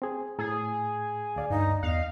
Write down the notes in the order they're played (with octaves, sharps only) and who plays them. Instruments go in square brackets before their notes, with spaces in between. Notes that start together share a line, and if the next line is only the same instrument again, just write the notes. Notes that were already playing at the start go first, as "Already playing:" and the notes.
[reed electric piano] C4 G#4
[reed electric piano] A2 [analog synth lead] G#4
[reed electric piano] D2 D5 [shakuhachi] F5
[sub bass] G2 [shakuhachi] D#4
[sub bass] E2 [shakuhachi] D#5 [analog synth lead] F5